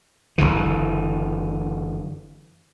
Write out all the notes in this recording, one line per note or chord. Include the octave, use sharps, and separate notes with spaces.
F#1 D#2 D3 E3